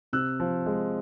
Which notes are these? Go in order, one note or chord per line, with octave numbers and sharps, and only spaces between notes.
C3 E6 F#6
F3
G#3